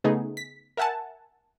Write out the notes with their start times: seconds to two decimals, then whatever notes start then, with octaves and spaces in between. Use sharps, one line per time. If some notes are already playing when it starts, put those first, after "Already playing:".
0.04 C#3 A3 B3 D#4 G#4
0.37 B6
0.77 A#4 E5 F#5 G#5 A5